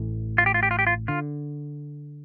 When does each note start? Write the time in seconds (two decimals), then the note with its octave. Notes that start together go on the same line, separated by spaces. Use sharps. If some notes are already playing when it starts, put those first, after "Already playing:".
Already playing: A1 A2 E3 A3
0.38 F4
0.46 G4
0.54 F4
0.63 G4
0.71 F4
0.79 G4
0.87 F4
1.08 D3 F4